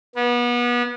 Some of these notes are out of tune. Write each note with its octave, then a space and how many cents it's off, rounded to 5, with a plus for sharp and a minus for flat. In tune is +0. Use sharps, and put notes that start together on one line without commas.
B3 -30